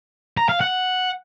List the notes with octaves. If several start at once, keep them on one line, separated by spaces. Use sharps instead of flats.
A#5
F5
F#5